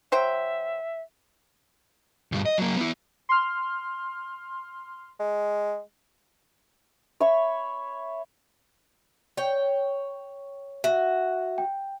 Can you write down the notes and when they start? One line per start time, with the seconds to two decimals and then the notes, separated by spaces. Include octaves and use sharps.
0.12 F#3 C5 E5 G5
2.32 D2 G2
2.46 D#5
2.58 F#3 A#3
2.77 B3 E4
3.29 C6 F6
5.20 G#3
7.20 C#5 E5 B5 C#6
9.37 C#5 G5
10.84 F#4 E5
11.58 G5